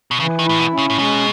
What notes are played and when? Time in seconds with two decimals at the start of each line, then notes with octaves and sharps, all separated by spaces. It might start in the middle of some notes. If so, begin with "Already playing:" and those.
0.11 B2
0.20 C#3 E3
0.39 D#3
0.45 A2 E4
0.59 B2
0.73 C#4
0.78 C#3
0.90 A2
0.98 B2 G#3